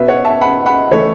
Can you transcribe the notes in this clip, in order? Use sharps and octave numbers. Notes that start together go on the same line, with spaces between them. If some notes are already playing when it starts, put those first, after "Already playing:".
Already playing: B2 B3 B4 E5
C#5 F#5
E5 A5
F#5 B5
F#5 B5
E3 A3 A4 C#5